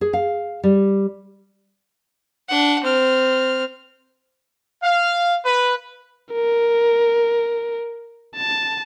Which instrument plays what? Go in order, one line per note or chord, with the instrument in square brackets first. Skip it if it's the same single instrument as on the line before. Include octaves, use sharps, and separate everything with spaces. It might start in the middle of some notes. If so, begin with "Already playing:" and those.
[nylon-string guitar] G#4
F5
G3
[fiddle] D4 F#5
C4 F6
[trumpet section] F5
B4
[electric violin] A#4
A5